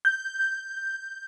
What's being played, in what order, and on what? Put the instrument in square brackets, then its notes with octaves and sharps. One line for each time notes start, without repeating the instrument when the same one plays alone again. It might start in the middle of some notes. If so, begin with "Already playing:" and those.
[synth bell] G6